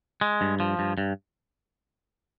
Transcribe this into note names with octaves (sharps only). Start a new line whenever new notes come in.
G#3
G2
F3
G2
G2